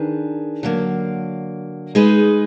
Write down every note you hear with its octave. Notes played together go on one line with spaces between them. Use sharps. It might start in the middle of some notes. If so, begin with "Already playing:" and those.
Already playing: D#3 D4 G#4 B4
D3 F#3 A#3
G#3 D#4 G#4 B4